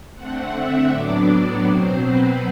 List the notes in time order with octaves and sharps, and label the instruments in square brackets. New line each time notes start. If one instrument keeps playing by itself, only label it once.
[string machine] D3 A3 C4 F#5
E5
A2 F#3 B3 D4 D5
D5
B2 F#3 C4 C5
B4